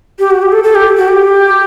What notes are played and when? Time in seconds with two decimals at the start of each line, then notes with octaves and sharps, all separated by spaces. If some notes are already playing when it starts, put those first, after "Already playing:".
0.19 G4
0.31 F#4
0.42 G4
0.52 A4
0.64 A4
0.75 G4
0.97 F#4
1.08 G4